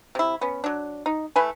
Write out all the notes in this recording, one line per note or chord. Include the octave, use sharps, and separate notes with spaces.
C3 E4
B3 C#4
F#3 D4
D#4
E3 A3 B4 G#5